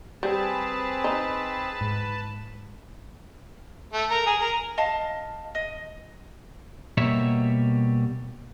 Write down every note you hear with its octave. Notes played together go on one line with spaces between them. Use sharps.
G3 C4 G#4 B4 A5
D#4
G#2
A3
A#4
G#4
A#4
D#5 F5 A5
D#5
B2 G3 A#3 C#5 E5